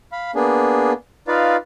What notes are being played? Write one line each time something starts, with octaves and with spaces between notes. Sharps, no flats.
F5 B5
A#3 B3 D4 G#4
D#4 F4 B4 D5 F5